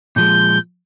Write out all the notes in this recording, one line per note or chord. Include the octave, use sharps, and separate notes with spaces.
A#2 F3 G#3 G6